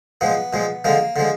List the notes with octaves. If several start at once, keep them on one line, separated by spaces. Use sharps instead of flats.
A#2 F3 G#3 B3
A#2 F3 G#3
D3 F3 G#3 A#3
D3 F3 G#3